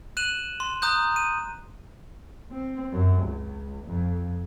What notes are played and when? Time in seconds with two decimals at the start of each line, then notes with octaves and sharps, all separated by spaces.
0.17 F#6 D#7 E7 F#7
0.60 C6
0.82 A#5 D#6 F#6 G6
1.16 D#7
2.51 C4
2.93 F#2
3.22 C#2
3.86 F2